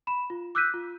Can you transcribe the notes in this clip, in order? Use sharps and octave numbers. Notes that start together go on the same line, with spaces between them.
B5 E7
F4
D6 E6 F#6 G6 B6 D#7
F4